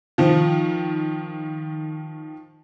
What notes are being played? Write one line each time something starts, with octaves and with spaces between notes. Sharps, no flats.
D#3 F3